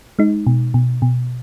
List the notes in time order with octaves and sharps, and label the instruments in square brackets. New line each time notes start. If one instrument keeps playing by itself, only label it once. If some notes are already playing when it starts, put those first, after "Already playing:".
[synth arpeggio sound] G#3 D#4
B2
B2
B2